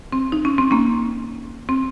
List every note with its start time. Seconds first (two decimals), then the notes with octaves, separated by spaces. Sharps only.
0.12 C4
0.32 D#4
0.45 C#4
0.58 C4
0.71 A#3 C#4
1.69 C4